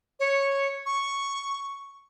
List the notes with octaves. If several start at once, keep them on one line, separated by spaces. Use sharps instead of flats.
C#5
C#6